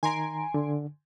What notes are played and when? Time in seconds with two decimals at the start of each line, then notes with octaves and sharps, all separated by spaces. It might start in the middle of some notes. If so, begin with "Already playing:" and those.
0.03 D#3 G#5 A#5 C6 D7
0.54 D3